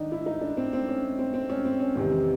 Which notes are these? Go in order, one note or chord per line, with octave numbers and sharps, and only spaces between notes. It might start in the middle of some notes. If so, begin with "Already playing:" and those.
Already playing: D#3 D4 D#4
E4
D#4
D4
C4
C4
C#4
C4
C4
C#4
C4
C#4
E2 C3 D#3 C4